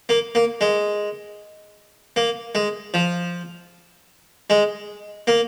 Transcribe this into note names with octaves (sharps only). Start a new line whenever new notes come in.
A#3
A#3
G#3
A#3
G#3
F3
G#3
A#3